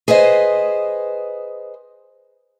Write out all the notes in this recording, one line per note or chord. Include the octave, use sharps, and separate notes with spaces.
G#4 B4 C5 D#5